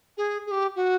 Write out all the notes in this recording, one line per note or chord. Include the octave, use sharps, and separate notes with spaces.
G#4
G#4
G4
F#4